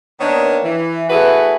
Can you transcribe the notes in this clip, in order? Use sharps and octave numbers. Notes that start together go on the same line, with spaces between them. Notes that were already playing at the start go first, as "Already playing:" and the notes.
D#3 A#3 B3 D4 C#5
E3
A3 E4 F#4 G#4 B4